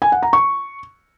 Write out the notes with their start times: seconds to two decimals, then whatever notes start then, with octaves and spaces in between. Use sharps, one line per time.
0.02 G#5
0.12 F#5
0.23 A#5
0.33 C#6